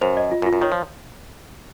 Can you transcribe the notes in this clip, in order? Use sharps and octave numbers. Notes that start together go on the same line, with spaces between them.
F#2 C5
D#5
F4
F#2
F4
F#2
D#3 C#5
F3